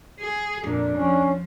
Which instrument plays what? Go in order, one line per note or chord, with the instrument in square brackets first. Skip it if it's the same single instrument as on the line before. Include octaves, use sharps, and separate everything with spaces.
[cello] G#4
[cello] F2 A#2 [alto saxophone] D4
[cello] F3 [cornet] C#4